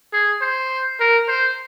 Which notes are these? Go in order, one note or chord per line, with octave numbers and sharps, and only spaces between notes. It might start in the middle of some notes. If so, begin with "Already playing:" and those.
G#4
C5
A#4
C5